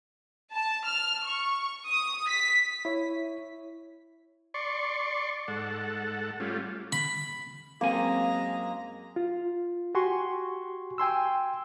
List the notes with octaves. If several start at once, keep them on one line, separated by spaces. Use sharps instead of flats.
A5
F6
C#6
D#6
B6
E4 C#5
D5 C6 C#6
G#2 A4 F#5
G3 A3 C#4 F4
B5
F#2 G#3 A#3 C4 G#5 A#5
F4
F#4 G4 G#5 C6 C#6
G5 G#5 C6 E6